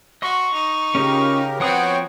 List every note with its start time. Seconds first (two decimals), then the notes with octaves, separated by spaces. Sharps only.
0.22 F#4 D#5 C6 C#6
0.53 D#4
0.95 C#3 C#4 F4 G4 A#4
1.60 F3 B3 C4 F#4 C#5 F#5 G5 D#6